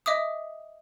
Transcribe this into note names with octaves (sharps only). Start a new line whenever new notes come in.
D#5 E5 D6 D#6